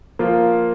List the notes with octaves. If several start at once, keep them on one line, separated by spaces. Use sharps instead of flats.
F3 A#3 F4